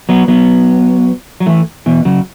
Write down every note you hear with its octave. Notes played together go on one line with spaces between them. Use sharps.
F#3 B3
F#3 B3
F#3
E3 A3
B2 E3
C#3 F#3